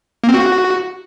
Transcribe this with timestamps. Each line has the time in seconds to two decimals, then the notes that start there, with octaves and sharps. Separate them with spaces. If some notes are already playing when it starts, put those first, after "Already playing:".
0.24 A#3
0.29 C4
0.34 F#4